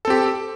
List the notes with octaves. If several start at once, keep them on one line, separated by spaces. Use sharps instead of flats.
C4 G4 A4